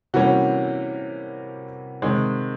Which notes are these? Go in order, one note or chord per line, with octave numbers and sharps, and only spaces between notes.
C3 E3 G3 A#3 C#4 F#4
C3 D#3 G#3